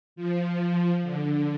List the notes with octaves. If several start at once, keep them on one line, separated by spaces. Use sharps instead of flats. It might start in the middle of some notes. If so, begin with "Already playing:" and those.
F3
D3